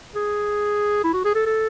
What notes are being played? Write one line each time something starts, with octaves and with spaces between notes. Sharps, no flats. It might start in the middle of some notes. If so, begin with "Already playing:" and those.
G#4
E4
F#4
G#4
A4
A4